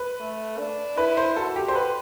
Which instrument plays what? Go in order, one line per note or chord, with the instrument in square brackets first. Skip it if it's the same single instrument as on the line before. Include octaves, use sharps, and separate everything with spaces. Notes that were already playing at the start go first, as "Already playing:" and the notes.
Already playing: [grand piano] B4
[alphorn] A3
D4
[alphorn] E4 [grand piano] B4
[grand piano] C5
[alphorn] F#4 [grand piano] A4
[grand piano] G4
C5
B4